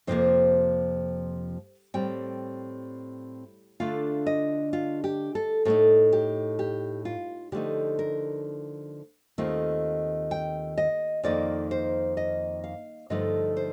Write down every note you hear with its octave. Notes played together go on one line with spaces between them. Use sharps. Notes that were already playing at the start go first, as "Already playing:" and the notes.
F2 C3 F3 A#3 C5
A2 G3 C4 G5
D3 A3 D4 F4 F5
D#5
F4
G4
A4
A2 A3 D#4 A4
G4
G4
F4
D3 F3 A3 D#4 G4
A#4
D#2 D#3 A3 C4 F4
G5
D#5
F2 D#3 A#3 D#4 D5
C5
D#5
F5
G2 D3 F3 A3 D#4 D#5
C5